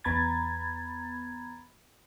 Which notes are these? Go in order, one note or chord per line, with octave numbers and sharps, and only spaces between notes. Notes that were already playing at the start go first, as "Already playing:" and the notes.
E2 B3 A#5 B5 G#6 A6